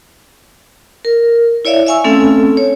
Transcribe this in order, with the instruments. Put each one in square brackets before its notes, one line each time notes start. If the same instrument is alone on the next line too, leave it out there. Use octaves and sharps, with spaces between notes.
[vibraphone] A#4
E4 C#5 D5 E5 F5
E5 F5 G#5 C#6 E6
A3 C4 C#4 A4
C#5